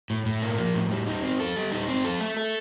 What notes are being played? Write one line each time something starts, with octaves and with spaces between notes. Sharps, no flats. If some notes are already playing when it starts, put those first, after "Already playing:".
A2
A2
A#3
F3
A2
G3
D#4
C4
A4
G3
D#4
C4
A4
A3
A4